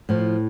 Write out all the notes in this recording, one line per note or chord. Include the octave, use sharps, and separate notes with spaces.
A2 F3